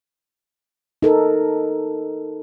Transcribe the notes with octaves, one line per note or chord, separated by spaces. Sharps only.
D#4 A4 A#4